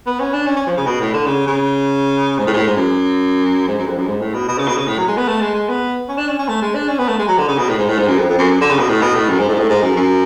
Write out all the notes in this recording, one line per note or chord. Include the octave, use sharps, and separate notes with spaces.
B3
C#4
D4
C#4
C#4
F3
C#3
B2
A2
D3
C#3
C#3
G#2
A2
G#2
A2
G#2
F#2
G#2
F#2
F2
F#2
G#2
A2
B2
B2
C#3
B2
C#3
A2
F#3
G#3
B3
A3
G#3
G#3
B3
C#4
D4
C#4
C#4
A3
G#3
D4
C#4
B3
A3
G#3
F#3
D3
C#3
B2
A2
G#2
A2
G#2
F#2
F2
F2
F#2
D3
C#3
B2
A2
B2
A2
F#2
G#2
A2
G#2
A2
G#2
F#2
F#2